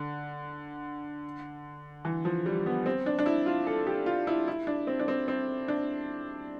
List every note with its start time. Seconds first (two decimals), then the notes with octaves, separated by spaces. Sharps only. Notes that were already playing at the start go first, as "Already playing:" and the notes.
Already playing: D3
2.05 E3
2.25 F3
2.46 G3
2.66 B3
2.86 C4
3.06 D4
3.19 D4
3.26 E4
3.46 F4
3.67 A4
3.87 G4
4.06 F4
4.27 E4
4.48 E4
4.67 D4
4.87 C4
4.99 D4
5.08 C4
5.28 C4
5.68 D4